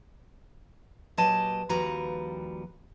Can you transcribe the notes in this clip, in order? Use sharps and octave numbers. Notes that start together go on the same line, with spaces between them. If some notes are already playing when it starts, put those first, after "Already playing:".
A#2 F#3 G4 B4 D#5 A5
D#2 F3 G3 F#4 B4 A#5